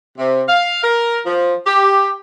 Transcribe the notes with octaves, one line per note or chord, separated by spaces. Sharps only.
C3
F5
A#4
F3
G4